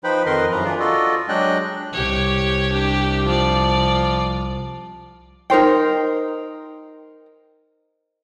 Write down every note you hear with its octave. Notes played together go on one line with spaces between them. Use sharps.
F3 D#4 B4 C5 G5 B5
F2 D#3 A#4 B4 D#5 C6
F#2 E3 F3 B4 A#5
D4 F4 G#4
F4 F#4 A4 D5 D#5
F#3 G#3 D4 D#5 G5 F#6
C2 G4 C#5
D4 G4
F3 F4 D5
D#4 A#4 C5 G5